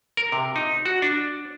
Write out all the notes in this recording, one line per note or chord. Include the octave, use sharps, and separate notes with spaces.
A#4
C3
D#4
F#4
D4